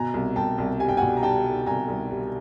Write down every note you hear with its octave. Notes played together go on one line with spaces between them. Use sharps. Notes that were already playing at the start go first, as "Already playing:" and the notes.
Already playing: B2 G#5 A#5
C2
C2 G5 A5
C2
G3 G#5
G5
B2 F#5 G#5
A#5
G3 G5 A5
G3
C2 G#5 A#5
C2
G3